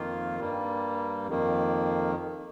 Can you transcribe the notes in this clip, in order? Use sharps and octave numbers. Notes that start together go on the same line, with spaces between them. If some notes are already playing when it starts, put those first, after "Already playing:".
Already playing: F2 D#3 A#3 F4
G2 G3 A#3
F2 D#3 A#3